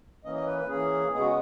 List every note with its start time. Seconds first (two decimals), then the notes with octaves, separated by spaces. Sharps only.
0.24 E3 A#3 C#4 D#5
0.35 D#5
0.47 B4
0.58 B4
0.68 E3 A#3 C#4 G#4
1.13 C#3 G#3 B3 G#4
1.21 F#4